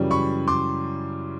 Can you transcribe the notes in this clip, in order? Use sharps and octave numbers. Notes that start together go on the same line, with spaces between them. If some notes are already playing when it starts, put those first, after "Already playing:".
Already playing: F#2 C#3 E3 G3
B5 C#6
C6 D6